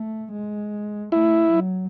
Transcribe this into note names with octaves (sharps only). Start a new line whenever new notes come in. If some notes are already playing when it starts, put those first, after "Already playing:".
Already playing: A3
G#3
A3 E4
F#3